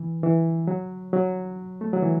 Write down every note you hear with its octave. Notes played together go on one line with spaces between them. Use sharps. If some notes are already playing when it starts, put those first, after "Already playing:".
Already playing: E3
E3
F#3
F#3
A3
F#3
E3